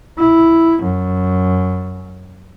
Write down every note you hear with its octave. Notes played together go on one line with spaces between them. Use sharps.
E4
F#2